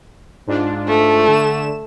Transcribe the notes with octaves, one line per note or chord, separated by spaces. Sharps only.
G#2 D4 F4
A3
D3 E7